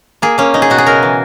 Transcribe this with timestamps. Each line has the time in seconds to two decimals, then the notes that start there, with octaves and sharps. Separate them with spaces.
0.22 A#3 G#4
0.38 A#3 C#4
0.54 B2 D#4
0.62 G#4
0.70 B2 F#4
0.78 G#4
0.86 C#3 A#4
1.03 E3